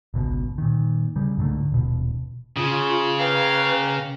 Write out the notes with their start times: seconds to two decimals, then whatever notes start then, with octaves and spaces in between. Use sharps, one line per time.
0.14 G#1 C#2 B2
0.58 A#2 D#3
1.16 C#3 G3
1.37 C#2 G#2 D3 A3
1.72 D#1 B2
2.57 C#3 F4 G#4
3.19 A#3 B4 F5 G5 A#5 F6